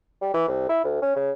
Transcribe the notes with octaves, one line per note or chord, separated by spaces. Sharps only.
G3
E3
C2
E4
D2
C#4
C#3